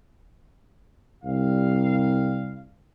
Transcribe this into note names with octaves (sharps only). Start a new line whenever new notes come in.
C2 G3 F5